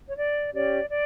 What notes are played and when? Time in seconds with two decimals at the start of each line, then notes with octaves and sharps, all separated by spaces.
0.09 C#5
0.16 D5
0.53 C#4 G4 C#5 D5
0.89 D5